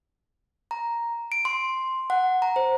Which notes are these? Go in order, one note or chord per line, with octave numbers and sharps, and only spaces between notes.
A#5
D7
C6
F#5
A#5
C5